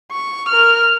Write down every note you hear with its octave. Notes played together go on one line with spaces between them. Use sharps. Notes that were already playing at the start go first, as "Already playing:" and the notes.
C#6
A#4 F6